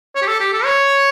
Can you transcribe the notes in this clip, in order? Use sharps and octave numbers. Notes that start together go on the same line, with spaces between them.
C#5
G4
A4
G4
A4
C#5